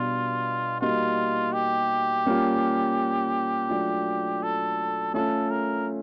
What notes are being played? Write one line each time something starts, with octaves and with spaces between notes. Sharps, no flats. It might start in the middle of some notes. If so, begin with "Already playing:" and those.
Already playing: B2 G3 B3 D4 F4
G3 A#3 D#4 F4 F#4
G4
G3 A#3 C#4 F4
F#3 A3 D4 F4
A4
A3 C#4 F4 A4
A#4